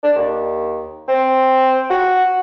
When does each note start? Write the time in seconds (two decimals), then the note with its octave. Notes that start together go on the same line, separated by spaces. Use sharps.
0.03 D4
0.16 D#2
1.08 C4
1.90 F#4